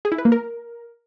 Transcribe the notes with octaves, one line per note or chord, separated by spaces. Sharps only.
G#4
E4
B4
A#3
A#4